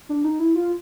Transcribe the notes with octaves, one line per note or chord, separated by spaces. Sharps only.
D4
D#4
E4
F4